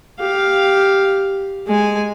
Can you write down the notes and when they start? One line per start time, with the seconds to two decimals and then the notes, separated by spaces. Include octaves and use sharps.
0.20 G4 F5
1.67 G#3 G#5